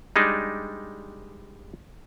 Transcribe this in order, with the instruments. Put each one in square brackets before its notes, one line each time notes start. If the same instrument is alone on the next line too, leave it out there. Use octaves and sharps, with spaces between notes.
[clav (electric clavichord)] G3 G#3 D4 D#4